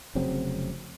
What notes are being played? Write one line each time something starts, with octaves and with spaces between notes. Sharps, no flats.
F1 C#3 F#3 C4